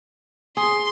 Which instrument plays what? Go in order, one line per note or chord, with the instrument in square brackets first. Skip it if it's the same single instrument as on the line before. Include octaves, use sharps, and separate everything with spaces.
[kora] G#4 [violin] C6